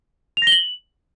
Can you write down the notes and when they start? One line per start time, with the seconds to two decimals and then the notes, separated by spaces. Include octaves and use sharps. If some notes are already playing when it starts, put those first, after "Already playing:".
0.37 F7
0.42 A#6
0.47 G7
0.52 F#7